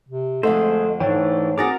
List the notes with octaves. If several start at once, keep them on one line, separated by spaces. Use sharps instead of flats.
C3
F2 D3 G#3 A3 A4 C5 D#5
G#2 E3 A3 D4 C#5 G5
C4 D4 F#4 G#4 A#4 D6 A6 A#6